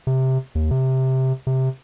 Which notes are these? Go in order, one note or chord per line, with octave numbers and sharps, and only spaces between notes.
C3
D#2
C3
C3